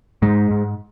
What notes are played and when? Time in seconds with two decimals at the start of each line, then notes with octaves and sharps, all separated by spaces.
0.22 G#2 G#3
0.51 G#2